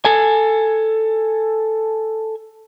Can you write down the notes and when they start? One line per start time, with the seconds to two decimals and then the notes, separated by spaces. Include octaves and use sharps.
0.05 A4 G#5